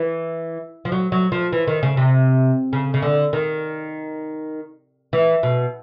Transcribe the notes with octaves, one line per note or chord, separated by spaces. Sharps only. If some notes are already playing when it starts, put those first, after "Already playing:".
Already playing: E3
F3
F#3
F#3
F3
E3
D#3
C#3
C3
C#3
C#3
D3
D#3
E3
B2